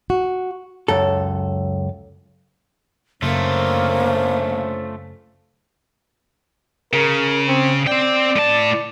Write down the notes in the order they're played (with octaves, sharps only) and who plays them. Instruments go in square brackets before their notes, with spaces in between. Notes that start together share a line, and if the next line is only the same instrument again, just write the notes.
[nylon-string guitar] F#4
[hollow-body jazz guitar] C#2 F#2 A4
[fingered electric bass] F#2 C#3 [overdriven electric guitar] A3 F4 [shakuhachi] A#3 [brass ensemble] C#4 D4 C5
[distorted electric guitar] C#3 [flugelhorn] A#4
[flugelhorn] C4
[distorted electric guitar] C4 G5 [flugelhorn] D5
[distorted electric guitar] A2 A5